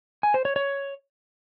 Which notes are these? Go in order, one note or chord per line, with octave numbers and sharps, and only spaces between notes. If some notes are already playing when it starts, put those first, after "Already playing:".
G#5
C5
C#5
C#5